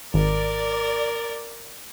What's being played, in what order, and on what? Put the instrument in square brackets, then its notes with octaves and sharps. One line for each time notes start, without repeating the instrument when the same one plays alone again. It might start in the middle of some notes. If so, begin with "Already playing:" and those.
[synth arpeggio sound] G#1 [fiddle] A#4 [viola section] D5